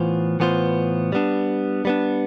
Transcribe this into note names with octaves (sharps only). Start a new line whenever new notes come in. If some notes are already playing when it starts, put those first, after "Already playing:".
Already playing: A2 E3 B3 F4 C5
A2 E3 B3 F4 C5
G3 B3 D4
G3 B3 D4